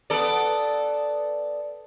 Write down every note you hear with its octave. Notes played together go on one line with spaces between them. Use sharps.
B3 A4 D5